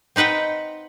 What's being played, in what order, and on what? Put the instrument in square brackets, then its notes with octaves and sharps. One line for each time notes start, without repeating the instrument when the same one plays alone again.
[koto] C4 D#4 B4 F#5 G5